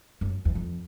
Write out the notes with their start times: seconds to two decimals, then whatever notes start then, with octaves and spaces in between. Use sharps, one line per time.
0.21 F#2
0.45 E2
0.55 F2